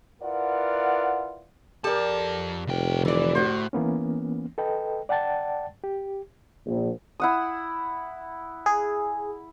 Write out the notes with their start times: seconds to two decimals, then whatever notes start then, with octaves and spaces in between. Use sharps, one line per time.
0.22 E4 F4 A#4 B4 D5 F#5
1.84 F2 G4 A4 A#4 D5 A5
2.67 F1 C2 G5
3.05 D3 E3 E4 D5
3.35 A2 F#4 C5
3.73 E3 A#3 B3 C#4
4.58 A4 B4 D#5 G5
5.09 D5 F#5 G5 A5 A6
5.84 G4
6.67 A#1
7.20 E4 F#5 D#6
8.66 G#4